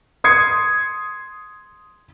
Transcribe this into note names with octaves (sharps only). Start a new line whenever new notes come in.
C6 D#6 G#6 C7 C#7